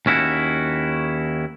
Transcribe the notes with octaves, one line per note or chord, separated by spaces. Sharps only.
D#2 C#4 E4 F#4